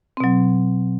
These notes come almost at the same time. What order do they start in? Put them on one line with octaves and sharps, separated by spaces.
C4 B2 F#3